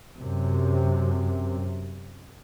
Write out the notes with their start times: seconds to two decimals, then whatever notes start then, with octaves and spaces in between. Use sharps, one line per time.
0.19 F#2 C3